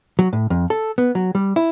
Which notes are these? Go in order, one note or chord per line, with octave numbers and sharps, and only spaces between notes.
F#3
A2
F2
A4
B3
F#3
G3
E4